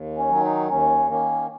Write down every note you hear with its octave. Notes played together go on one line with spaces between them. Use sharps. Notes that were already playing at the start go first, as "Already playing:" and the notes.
Already playing: D#2
C#4
D#3 F#3
D#4
D#2 C#4
D#3 A#3 C#4